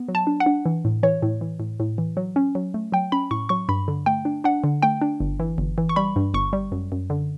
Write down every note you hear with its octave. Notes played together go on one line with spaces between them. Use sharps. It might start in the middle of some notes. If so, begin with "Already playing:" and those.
Already playing: B3
F#3
A5
D4
F#5
D4
E3
A2
E3 C#5
A2
E3
A2
A2
E3
F#3
C#4
F#3
A3
F#3 G5
C#4 B5
A2 C#6
F#3 C#6
G2 B5
D3
A3 G5
D4
D4 F#5
D3
A3 G5
D4
G1
E3
G1
E3
C#6
G3 B5
G2
G1 C#6
G3
F#2
F#2
D3